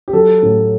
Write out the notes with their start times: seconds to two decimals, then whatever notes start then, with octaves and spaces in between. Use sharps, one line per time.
0.08 G4
0.13 F#3 A4
0.43 A2